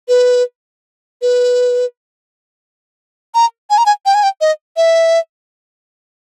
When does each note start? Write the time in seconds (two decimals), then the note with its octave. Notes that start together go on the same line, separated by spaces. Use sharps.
0.08 B4
1.22 B4
3.35 A#5
3.70 G#5
3.78 A#5
3.86 G#5
4.06 G5
4.15 G#5
4.23 G5
4.41 D#5
4.77 E5